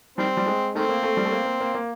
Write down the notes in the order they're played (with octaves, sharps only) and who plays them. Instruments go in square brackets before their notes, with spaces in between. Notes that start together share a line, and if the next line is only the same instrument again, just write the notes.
[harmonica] D#3 C4 [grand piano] G3
[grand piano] G3
G#3
[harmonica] D#3 C4 [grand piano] A3
[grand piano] A#3
A3
G3
A3
A#3
A#3
A#3
A#3